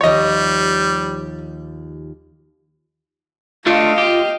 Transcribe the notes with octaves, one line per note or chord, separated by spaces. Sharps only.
D#2 F3 G3 C#5 D#5 A#6
A3 D4 F4 D#5 F5
G4